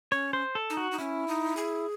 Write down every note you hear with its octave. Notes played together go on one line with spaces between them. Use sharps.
C#4 C#5
C5
A4
D#4
F#4
D#4
C#4 E4
D#4
G#4